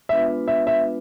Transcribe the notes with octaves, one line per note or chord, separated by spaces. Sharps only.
G#3 B3 D4 F4 B4 E5
E5
E5